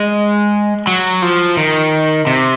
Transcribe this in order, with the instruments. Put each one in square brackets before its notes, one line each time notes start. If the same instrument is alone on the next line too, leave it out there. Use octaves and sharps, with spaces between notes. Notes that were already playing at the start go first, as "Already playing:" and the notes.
Already playing: [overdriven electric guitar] G#3
F#3
F3
D#3
C3